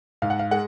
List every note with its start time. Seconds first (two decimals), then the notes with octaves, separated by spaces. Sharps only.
0.22 G#2 F5
0.30 F#5
0.39 F5
0.51 G#3 F#5